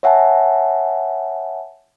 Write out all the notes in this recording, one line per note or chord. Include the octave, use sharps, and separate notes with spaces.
C#5 E5 F#5 G#5 A5